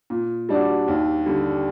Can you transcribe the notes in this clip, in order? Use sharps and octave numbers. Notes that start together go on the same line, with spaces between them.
A#2
G3 D4 F#4
D#2
D3 G3